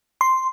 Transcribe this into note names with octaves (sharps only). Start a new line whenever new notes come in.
C6